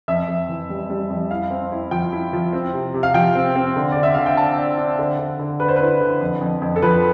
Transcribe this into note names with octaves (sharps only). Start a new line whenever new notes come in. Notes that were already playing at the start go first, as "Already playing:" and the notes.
F2 E5
F2
E3
G3
G3
F2
E4 F5
C4
E4
F3 G5
E4
F3
C4
C3
C3
F5
F3 G5
C4
C4
D3
D3 D5
E5
D3 F5
G5
D4 A5
D4
D4
D3
D3
D3
D3 B4
C5
E4 B4
D3
F2
F2
F2
A4
F3 B4